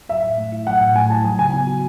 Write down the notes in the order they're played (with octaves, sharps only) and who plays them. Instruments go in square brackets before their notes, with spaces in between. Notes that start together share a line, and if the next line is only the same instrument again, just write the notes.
[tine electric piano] F#3 [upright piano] E5
[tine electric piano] A2
A3
E4
[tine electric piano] F#3 [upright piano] F#5
[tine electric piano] A2
[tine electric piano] A3 [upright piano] G#5
[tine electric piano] E4 [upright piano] A5
[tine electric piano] F#3 [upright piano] G#5
[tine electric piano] C#3 [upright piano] G#5
[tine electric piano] B3
F#4